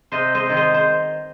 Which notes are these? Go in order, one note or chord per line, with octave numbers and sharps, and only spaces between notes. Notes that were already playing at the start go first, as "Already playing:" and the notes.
C3 C5 D#5
C5 D#5
D#3 G#3
C5 D#5
C5